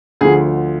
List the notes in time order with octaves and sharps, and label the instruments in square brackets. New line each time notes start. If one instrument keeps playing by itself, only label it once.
[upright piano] D2 D3 F3 G#4